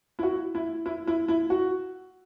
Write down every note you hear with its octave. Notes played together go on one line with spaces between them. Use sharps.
E4
F#4
E4
E4
E4
E4
F#4